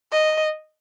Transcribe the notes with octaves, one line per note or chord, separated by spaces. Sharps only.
D#5